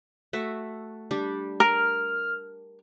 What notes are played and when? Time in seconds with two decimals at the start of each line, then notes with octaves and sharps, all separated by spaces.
0.33 A3 F#4 E5
1.11 G3 D4 G4
1.60 A#4 F6